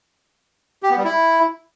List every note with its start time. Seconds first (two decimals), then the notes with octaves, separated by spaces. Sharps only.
0.83 G4
0.90 B3
0.97 G3
1.04 E4